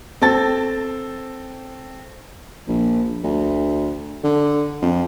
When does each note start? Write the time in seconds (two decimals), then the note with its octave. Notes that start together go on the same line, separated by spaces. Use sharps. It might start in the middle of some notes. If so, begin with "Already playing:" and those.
0.22 C4 A4 A6
2.68 A#1
3.24 D2
4.24 D3
4.82 F2